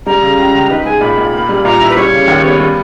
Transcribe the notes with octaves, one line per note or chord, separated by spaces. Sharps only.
G3 A#5
C#3
C#2
C#2
D#4 B4
G#3 G#5
A#2 B5
A#2
A#3
G3
A#2 A#5
E4
B4
G3 C#5
C#3
D#2
B3
G3